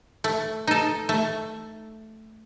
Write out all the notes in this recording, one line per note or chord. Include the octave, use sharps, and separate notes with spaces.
A3
D#4 A4
A3